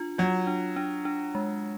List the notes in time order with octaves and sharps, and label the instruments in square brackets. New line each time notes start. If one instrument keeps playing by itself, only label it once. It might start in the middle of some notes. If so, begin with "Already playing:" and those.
Already playing: [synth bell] D4 F4
[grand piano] F#3 [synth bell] F4
[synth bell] D4
D4
D4
G#3